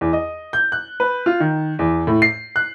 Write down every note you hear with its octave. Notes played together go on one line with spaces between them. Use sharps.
E2
D#5
G6
F#6
B4
F4
D#3
E2
A2
C7
F#6